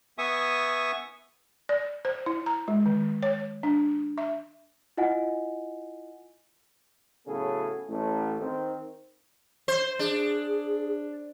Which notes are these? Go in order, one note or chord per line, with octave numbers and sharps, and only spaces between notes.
B3 E5 G#5 C#6 D#6
D5
C5
E4
A#5
G#3
D#3
C#5
D4
E5
E4 F4 D#5 F#5 G#5
A2 C#3 F#3 B3 G#4 A4
A1 A3
D#3 C4
C5
D4 G#4